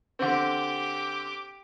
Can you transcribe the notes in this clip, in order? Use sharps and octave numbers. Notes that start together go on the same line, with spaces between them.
D3 C4 G4 D6